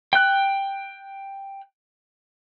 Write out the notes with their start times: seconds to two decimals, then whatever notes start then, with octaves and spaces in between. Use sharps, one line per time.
0.13 G5 F#6